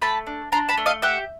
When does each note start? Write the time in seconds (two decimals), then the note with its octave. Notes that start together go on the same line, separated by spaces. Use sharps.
0.02 A3 A5 B5
0.27 D4
0.52 D4 A#5 C6
0.69 A5 B5
0.77 A3
0.86 D#5 F5
1.02 G4 E5 F#5